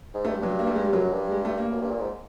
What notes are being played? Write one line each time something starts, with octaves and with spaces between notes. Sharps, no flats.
G#2
A3
G2
G3
G2 F#3
A#3
A3
G#3
G3
F#2 F#3
G2
G3
G#3
A3
A#3
F#2
G2
A#2
G#2